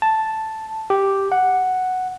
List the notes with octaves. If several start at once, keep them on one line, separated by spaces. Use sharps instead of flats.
A5
G4
F#5